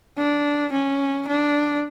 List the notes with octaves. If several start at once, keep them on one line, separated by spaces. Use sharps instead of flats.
D4
C#4
D4